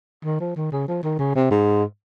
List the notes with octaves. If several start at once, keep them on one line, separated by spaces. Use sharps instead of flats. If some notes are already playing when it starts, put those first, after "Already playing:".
D#3
F3
D#3
C#3
F3
D#3
C#3
C3
G#2